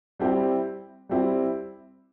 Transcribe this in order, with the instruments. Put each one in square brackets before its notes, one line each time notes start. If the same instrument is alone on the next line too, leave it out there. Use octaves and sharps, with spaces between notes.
[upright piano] G3 C4 E4 G4
G3 C4 E4 G4